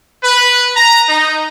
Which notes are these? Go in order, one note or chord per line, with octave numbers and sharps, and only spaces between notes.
B4
A#5
D#4